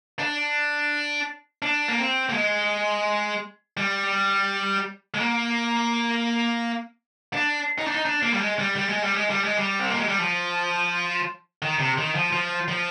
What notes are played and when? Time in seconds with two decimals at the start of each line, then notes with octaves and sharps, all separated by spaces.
0.19 D4
1.62 D4
1.88 A#3
1.98 C4
2.29 A#3
2.33 G#3
3.77 G3
5.14 G#3
5.20 A#3
7.33 D4
7.78 D#4
7.87 D4
7.95 D#4
8.05 D4
8.23 A#3
8.34 G3
8.41 G#3
8.59 G3
8.76 G3
8.89 G#3
9.03 G3
9.16 G#3
9.30 G3
9.44 G#3
9.57 G3
9.80 C4
9.90 A#3
10.00 G#3
10.09 G3
10.19 F3
11.62 D#3
11.79 C3
11.98 D#3
12.15 F3
12.32 F3
12.68 F3